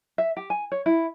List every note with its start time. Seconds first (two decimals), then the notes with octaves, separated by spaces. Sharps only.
0.18 E5
0.37 G4
0.50 G#5
0.72 C#5
0.86 E4